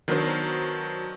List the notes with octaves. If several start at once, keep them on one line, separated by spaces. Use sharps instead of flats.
D#3 F#3 B3 D4 A#4 C5